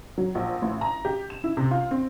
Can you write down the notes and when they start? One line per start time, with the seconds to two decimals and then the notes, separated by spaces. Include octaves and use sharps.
0.18 F#3
0.35 A#1
0.62 A1
0.81 A#5
1.05 G4
1.30 E7
1.44 E4
1.57 C3
1.71 F4
1.91 C4